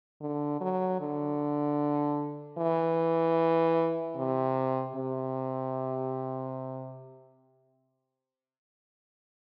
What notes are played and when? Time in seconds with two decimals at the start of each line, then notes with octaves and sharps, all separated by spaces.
0.21 D3
0.61 F#3
1.00 D3
2.58 E3
4.16 C3
4.95 C3